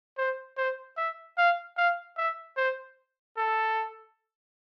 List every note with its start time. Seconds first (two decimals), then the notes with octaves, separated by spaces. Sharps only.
0.18 C5
0.57 C5
0.97 E5
1.38 F5
1.77 F5
2.17 E5
2.57 C5
3.37 A4